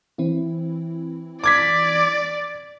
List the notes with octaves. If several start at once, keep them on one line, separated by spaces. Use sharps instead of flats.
E3 C4 E4
D5 D6 G#6 B6